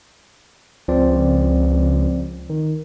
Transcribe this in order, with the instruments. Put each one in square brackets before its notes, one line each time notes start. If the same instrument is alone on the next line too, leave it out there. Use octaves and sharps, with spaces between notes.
[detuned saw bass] C#2 [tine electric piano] F3 C4 D5
[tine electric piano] D#3